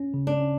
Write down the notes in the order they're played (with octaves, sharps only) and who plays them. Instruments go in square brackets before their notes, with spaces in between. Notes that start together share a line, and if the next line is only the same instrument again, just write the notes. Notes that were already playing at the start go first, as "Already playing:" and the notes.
Already playing: [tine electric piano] C#4
C#3
[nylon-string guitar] D4
[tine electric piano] C#4